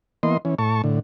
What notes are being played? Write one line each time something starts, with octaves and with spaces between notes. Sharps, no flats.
E3 A#3 B3 D#5 C6
E3 C#4
A2 A5 C#6
A2 D3